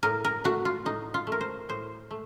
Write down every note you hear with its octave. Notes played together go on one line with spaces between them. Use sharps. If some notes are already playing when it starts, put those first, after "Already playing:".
A2 A#4
A#4
A3 F#4
F4
A2 D#4
F4
A3
A#4
C5
A2 C5
A3